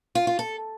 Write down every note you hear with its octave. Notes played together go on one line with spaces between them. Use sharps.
F4
F4
A4